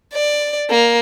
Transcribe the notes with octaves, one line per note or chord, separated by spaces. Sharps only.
D5
A#3